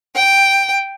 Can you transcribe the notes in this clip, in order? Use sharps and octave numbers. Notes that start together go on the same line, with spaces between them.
G5